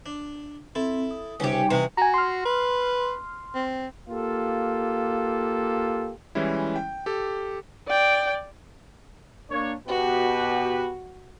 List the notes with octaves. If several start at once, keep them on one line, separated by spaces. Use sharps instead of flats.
D4
C4 E4 A4
D#6
C#2 C3 G3 C#4 D#4 G4
C3 E3 F#4 D#5
F#4 G#5 A#5
C6 F6
B4
C4
A#3 F4 G4 A4
E3 G3 G#3 C#4 E4
G5
G4 A4
D5 G5
A#3 D4 C#5
B2 F#4 G4 B4